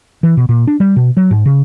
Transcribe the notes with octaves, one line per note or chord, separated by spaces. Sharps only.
E3
B2
A#2
D4
G3
B2
F#3
G#2
C#3